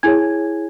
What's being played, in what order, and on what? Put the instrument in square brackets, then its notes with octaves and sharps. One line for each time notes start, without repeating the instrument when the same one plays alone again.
[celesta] E4 G#4 C#5 G#5 G#6